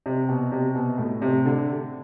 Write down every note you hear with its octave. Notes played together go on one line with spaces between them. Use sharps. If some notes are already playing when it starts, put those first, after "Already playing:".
C3
B2
C3
B2
A2
C3
D3